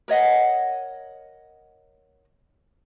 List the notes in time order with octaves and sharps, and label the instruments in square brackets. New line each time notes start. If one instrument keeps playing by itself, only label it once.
[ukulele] A#4 C#5 D#5 F#5